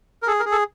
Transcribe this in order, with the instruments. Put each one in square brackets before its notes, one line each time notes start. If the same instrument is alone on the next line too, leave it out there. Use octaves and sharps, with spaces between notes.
[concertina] A#4
G#4 A4
A#4
G#4
A4